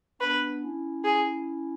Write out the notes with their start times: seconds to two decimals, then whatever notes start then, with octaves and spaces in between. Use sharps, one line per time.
0.21 B3 D4 B4
0.63 C#4 E4
1.04 G#4